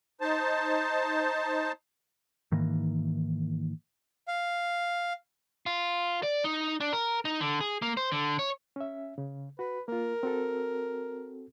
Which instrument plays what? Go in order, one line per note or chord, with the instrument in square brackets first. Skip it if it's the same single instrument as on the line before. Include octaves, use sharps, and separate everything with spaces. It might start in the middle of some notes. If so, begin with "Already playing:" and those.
[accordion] D#4 C5 A5
[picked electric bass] G#2 D#3 E3 A#3
[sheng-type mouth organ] F5
[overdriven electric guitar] F4
D5
D#4
D4
A#4
D#4
D3
G#4
A#3
C5
D3
C#5
[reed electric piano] C#4 E5
C#3
[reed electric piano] F#4 [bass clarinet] B4
[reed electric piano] A#3 F4 [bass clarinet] A#4
[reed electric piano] C4 F#4 A4